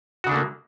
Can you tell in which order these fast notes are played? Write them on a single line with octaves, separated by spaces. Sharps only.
F#4 C#3 D4 A3 A#3